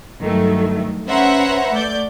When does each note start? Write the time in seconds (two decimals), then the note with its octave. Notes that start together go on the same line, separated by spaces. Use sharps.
0.21 G2 D#3 F#3 A3
1.08 C#4 B4 C5 E5 F#5 A#5
1.73 A3 D5 G6